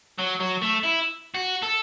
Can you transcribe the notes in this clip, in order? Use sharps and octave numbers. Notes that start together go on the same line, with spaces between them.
F#3
F#3
A3
E4
F#4
A4